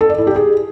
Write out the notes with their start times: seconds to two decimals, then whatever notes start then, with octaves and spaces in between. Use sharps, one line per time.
0.01 A4
0.09 D5
0.18 E4
0.27 G4
0.36 G#4